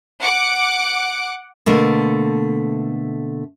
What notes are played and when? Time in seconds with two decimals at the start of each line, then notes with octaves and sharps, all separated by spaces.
0.22 F#5 D6
1.66 B2 D3 A3 A#3